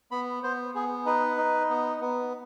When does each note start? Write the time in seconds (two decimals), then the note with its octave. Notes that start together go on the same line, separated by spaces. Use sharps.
0.11 B3 B5
0.43 B3 C5
0.75 B3 G#4
1.06 D#4 B4
1.37 D#4
1.69 B3
2.01 B3